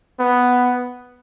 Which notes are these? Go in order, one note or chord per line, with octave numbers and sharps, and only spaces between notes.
B3